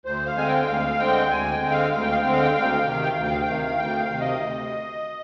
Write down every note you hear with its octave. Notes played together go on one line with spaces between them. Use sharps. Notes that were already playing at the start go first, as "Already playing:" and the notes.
D2 C5
F5
D3 G#3 C4 G#5
G5
D2 F5
D3 G#3 C4 G5
D2 G#5
G5
D3 G#3 C4
F5
D2 F5
G5
F5
D3 G#3 C4 G5
F5
G5
D2 F5
G5
F5
C3 D#3 G5
F5
G5
D2 F5
G5
F5
G5
C3 D#3 F5
D2 G5
F5
C3 D#3
D#5
D2